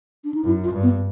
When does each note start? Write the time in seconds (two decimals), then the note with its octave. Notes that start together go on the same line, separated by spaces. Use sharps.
0.24 D4
0.34 D#4
0.44 F#2 E4
0.64 F4
0.73 G2
0.83 B3